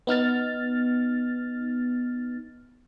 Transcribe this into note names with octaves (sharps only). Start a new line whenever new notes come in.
B3 D#4 F6 A6